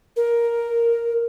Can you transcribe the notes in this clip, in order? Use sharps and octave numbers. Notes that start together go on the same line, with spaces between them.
A#4